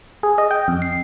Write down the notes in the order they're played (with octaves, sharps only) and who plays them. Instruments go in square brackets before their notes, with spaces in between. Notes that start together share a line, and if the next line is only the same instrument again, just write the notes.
[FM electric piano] G#4
D#5
G5
F2
C7